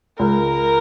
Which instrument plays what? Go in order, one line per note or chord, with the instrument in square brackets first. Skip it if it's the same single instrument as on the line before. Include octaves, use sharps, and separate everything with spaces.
[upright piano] C#2 [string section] A#4